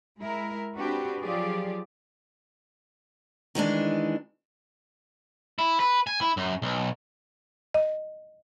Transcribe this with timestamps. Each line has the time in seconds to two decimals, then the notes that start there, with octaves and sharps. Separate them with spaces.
0.19 G#3 E4 A#4
0.79 C4 D4 F#4 G4 B4
1.21 F3 F#3 F4 G4 G#4 D5
3.55 D#3 E3 G#3 D4
5.59 E4
5.80 B4
6.07 G#5
6.21 E4
6.37 F#2
6.62 B1
7.74 D#5